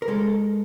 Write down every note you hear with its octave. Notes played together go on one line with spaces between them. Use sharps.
A#4
G#3 A4